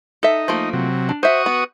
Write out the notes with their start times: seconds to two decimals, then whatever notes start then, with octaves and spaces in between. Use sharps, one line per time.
0.23 D#4 A4 E5
0.48 F3 A3 A#3
0.73 C3 F#3
1.09 D4
1.23 F#4 C5 E5 C#6 D#6
1.46 B3